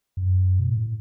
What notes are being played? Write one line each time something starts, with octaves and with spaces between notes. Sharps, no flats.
F#2
B2
A2